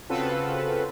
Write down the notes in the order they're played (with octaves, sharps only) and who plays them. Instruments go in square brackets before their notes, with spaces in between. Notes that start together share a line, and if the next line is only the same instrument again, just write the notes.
[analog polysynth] C#3 C4 F4 F#4 A4 B4